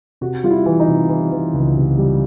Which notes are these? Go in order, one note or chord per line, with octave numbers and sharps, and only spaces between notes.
C3 F#4
G3 F4
E4
E3
D#4
C3
E3
E3
C#2
C3
G3